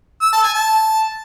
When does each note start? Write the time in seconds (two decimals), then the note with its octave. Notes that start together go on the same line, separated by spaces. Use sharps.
0.22 E6
0.33 A5
0.43 G#5
0.54 A5